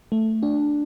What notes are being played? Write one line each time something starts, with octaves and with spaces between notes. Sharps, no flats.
A3
D4